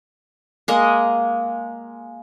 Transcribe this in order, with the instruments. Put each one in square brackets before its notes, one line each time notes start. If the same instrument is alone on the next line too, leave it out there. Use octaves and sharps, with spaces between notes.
[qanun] G#3 A#3 D#5